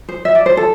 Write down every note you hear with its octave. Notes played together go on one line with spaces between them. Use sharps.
C5
E5
D5
C5
A4